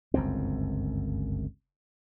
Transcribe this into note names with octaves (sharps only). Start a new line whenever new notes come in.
G1 C#2 F#2 C4